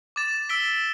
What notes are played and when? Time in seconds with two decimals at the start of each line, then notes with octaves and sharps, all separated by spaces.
0.16 D6 A6 E7
0.49 E6 B6 D7 G7